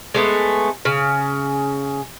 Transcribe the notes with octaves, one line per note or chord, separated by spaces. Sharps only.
G#3 A3 B3
C#3